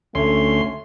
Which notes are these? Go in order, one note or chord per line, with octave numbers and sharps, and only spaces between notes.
D2 A3 C#4 C6